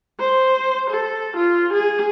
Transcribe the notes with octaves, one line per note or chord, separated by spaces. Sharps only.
C5
A4
F4
G#4